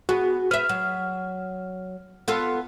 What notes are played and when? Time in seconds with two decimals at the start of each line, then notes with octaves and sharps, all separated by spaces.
0.09 B3 F#4 G#4
0.51 B4 E5 F6
0.69 F#3
2.28 B3 F4 A4